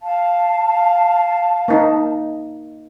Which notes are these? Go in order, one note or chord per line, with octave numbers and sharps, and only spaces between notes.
F5 A5
A#3 D#4